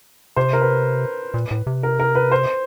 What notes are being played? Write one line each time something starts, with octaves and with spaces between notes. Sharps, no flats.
C3 C5
A#4
B4
A#2
A2
C3
A#4
A#4
B4
C5